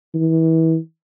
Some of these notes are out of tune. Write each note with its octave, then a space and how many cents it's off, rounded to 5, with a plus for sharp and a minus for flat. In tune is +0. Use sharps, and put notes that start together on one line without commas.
E3 -30